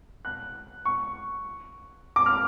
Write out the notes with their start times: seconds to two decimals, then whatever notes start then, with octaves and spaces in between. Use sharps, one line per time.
0.25 F#6
0.85 C#6
2.16 D6
2.26 F6